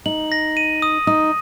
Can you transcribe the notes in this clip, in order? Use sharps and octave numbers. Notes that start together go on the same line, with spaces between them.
D#4 F#7
A#6
D#7
D#6
D#4 D#6